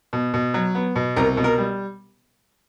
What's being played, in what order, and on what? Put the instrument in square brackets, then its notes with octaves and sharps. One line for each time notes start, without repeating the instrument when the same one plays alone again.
[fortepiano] B2
B2
F#3
B3
B2
C2 A#4
B2
A#4
G3